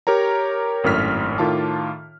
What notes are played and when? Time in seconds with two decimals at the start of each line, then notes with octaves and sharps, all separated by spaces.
0.07 G4 A#4 C#5 A#5
0.84 G#1 F#2 A2 F6 B6
1.38 A2 D#3 F4 A5 D6